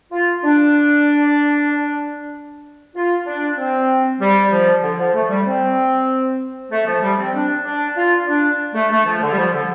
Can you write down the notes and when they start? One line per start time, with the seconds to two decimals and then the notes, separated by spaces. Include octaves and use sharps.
0.12 F4
0.44 D4
2.94 F4
3.26 D4
3.57 C4
4.20 G3
4.51 F3
4.82 D3
4.98 F3
5.14 A3
5.29 G3
5.46 C4
6.71 A3
6.86 F3
7.02 G3
7.17 C4
7.34 D4
7.64 D4
7.96 F4
8.27 D4
8.74 A3
8.90 A3
9.06 F3
9.22 D3
9.32 G3
9.37 F3
9.52 D3